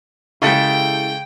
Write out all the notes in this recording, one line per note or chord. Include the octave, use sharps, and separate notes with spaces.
C#3 G#3 E4 G4 A4 G5